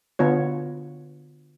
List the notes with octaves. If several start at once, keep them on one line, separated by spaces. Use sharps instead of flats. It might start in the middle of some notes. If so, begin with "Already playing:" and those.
D3 B3 F4 C#5